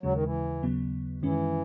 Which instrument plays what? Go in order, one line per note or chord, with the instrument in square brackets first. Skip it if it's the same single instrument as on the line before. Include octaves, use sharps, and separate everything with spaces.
[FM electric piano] D#2 C#3 G#3 [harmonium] F#3
[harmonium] D#3
E3
[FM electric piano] D#2 C#3 F#3 B3
[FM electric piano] F#2 D#3 G#3 C#4 [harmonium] E3